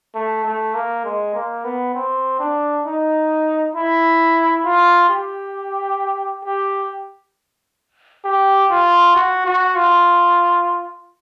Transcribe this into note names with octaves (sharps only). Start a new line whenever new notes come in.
A3
A3
A#3
G#3
A#3
B3
C4
D4
D#4
E4
F4
G4
G4
G4
F4
F#4
F#4
F4